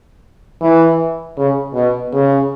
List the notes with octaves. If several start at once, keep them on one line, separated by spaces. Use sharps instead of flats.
E3
C#3
B2
C#3